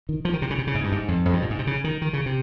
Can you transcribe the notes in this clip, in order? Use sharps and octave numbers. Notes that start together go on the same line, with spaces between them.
D#3
F3
D#3
C3
C#3
C3
C#3
G#2
G2
G#2
F2
F2
G2
A#2
G#2
C3
C#3
D#3
D#3
C#3
C3